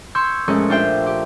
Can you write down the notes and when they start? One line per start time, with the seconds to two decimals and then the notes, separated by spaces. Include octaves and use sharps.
0.15 C6 C#6 E6 G6 G#6 C7
0.48 A#1 G#3 A3 C#4 C#6
0.69 D4 F4 G4 C5 E5 G5
1.06 G4